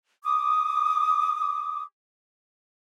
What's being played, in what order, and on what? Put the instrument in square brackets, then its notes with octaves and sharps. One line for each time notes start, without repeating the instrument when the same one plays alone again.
[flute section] D6 D#6